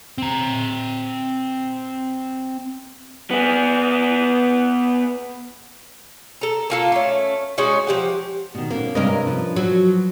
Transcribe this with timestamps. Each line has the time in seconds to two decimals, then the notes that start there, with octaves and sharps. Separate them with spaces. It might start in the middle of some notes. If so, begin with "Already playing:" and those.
0.18 C4 A#5
3.31 B3 G#4
6.41 A4 A#5
6.70 A#3 F4 A4
6.92 A3 C#4
7.58 G#3 C#4 D#4 F#4
7.87 F3 G4 F#5
8.55 B2 D#3
8.70 B2 A#3 C#4
8.95 G2 C3 G#3 C#4 A#4 D#5
9.27 F3 B4
9.56 F#3